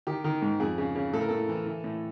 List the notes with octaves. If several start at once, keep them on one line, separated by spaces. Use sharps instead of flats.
D#3 G4
D#3
G#2
F2 G#4
C#3
C#3
A2 A4
A#4
A2 A4
E3
E3
A2